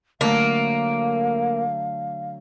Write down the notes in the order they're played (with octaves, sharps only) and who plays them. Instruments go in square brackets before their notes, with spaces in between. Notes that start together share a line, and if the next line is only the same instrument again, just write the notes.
[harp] D3 F#3 A3 [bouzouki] A#3 [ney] F5